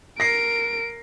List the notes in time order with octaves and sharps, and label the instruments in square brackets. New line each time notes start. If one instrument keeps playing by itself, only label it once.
[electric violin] A#4 D7 [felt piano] A#6 C7